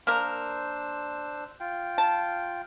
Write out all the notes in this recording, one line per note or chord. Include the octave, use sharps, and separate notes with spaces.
A#3 D4 A#4 C5 E6
F4 G5
A5